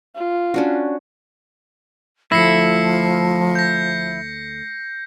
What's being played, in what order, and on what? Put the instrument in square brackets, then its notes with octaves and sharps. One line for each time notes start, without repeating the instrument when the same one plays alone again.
[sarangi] F4
[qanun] C#4 D4 F#4
[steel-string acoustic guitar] D2 G#2 A3 [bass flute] F3 [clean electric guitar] E4 [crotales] A#6 C7 C#7
[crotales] G6 A#6